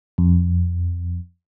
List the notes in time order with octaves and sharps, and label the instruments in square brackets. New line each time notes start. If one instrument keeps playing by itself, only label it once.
[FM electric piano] F2